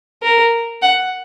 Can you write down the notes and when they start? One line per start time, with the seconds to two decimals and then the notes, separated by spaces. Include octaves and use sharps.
0.22 A#4
0.82 F#5